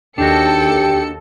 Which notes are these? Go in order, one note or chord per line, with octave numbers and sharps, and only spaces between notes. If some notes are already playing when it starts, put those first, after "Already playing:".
D#2 D4 D#4 F#4 G4 A4 G5 C#7